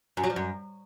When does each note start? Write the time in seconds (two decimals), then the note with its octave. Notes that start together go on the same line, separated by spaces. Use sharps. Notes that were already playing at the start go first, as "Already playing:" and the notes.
0.17 F#2
0.24 F#3
0.30 F3
0.36 F#2